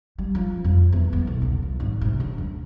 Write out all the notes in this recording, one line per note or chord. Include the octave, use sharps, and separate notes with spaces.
G3
F3
F2
E2
B3
B1
C2
F3
G#1
C3
D3
D2